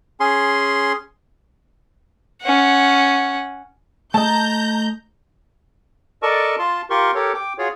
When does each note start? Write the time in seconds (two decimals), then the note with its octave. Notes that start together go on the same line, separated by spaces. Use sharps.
0.20 C#4 G#4 C6
2.42 C#4 F#5
4.14 A3 D#5 A5 A#5 G6
6.22 A4 A#4 D5 D#5 A5 C#6
6.59 F4 A5 C6
6.90 F4 G4 A#4 C6 C#6
7.15 G4 A4 A#4 C#5
7.34 G5 D6
7.58 F4 F#4 G#4 C#5